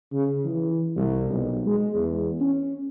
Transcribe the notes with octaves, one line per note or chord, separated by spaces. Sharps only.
C#3
E3
C2
B1
G#3
E2
C#4